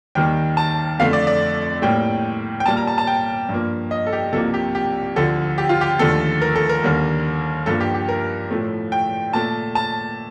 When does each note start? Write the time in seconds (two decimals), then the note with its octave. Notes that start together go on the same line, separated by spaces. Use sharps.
0.15 D#2 D#3 G3 A#3 G5
0.57 A5
0.99 F2 D3 A3 F5
1.13 D5
1.27 D5
1.82 A2 G3 A#3 G5
2.60 G5
2.66 A#2 G3 A#3 A5
2.77 A#5
2.87 A5
2.98 A5
3.07 G5
3.49 G2 F3 A#3
3.91 D#5
4.06 A4
4.13 G4
4.32 C2 C3 F3 A#3 A4
4.54 G4
4.75 G4
5.16 D2 D3 F3 A4
5.58 G4
5.69 F4
5.81 G4
5.99 D#2 D3 F3 A3 A4
6.41 A#4
6.55 A4
6.69 A#4
6.83 D#2 D3 G3 A#3
7.66 G2 F3 A#3 A4
7.80 G4
7.94 G4
8.08 A#4
8.51 A2 F3 A3
8.92 G5
9.33 A#2 A3 A5
9.75 A5